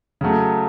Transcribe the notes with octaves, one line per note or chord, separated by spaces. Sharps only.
C#3 F#3 A3